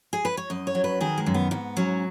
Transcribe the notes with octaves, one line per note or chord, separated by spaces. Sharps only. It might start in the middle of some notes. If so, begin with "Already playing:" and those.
G#4
B4
C#5
F#2 D#5
C#5
F#3
B4
D#3 G#4
G#3
F#2
B3
G#2 B3
F#3 C#4